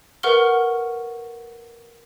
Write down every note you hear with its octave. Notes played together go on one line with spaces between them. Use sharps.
A#4 B4 F#5 C#6 F6 G7